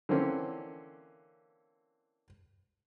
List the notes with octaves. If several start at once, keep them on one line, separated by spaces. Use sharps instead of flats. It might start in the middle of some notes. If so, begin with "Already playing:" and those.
D3 E3 A#3 C4 C#4